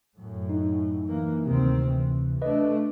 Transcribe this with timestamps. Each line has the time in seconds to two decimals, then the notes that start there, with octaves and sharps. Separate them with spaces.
0.18 F#2 A2
0.49 D#4
1.06 E3 A#3
1.46 D2 C3 D#3 C4
1.85 E3
2.42 A3 D4 B4 D#5